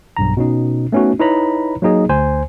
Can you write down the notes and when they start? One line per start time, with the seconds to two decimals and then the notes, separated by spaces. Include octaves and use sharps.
0.17 B1 G2 A#5
0.37 B2 C#4 D#4
0.92 A3 B3 C#4 D#4 F#4
1.19 D#4 E4 B4 C#5 A#5 B5
1.82 F#3 A#3 D#4 G#4 D#5
2.09 D2 C5 G#5